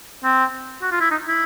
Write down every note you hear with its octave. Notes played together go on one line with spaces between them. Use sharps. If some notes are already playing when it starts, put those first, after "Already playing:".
C4
F#4
F4
E4
D#4
E4